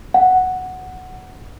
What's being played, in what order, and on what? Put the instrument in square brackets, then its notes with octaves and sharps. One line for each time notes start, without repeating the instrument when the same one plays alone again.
[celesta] F#5